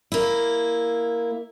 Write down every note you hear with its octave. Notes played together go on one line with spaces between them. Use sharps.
A#3 E4